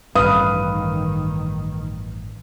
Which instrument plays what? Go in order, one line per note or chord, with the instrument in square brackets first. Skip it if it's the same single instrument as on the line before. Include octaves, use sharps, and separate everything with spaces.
[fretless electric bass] A1 G2 [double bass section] D#3 [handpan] B4 F5 [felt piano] D#6